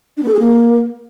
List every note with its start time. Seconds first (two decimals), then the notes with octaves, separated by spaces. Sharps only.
0.17 D4
0.23 B3
0.28 A4
0.34 G#4
0.39 A#3